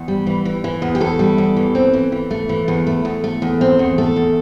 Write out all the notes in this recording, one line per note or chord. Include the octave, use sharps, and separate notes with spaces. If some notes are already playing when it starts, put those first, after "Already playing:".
Already playing: E2
G3
E3
E3
E3
E2
G4
E2 A4
G3
E2
E3
C4
E3
E3
A3
E3
E2
A3
E2
A3
E2
C4
E2
A3 A4
E2